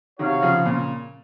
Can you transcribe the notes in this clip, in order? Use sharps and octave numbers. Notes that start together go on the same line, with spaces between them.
C3 D#3 F#4 C#5 F5
C#3 F3
A#2 C#3